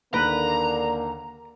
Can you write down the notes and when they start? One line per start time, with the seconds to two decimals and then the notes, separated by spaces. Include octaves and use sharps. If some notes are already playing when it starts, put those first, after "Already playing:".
0.14 D#2 D3 A#3 B4 A#5